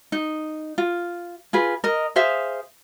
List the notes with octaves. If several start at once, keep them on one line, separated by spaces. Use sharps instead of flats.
D#4
F4
F4 G#4 B4
A#4 D#5
G#4 C5 E5 F5